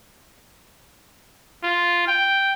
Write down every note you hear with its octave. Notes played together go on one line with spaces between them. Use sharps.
F4
G5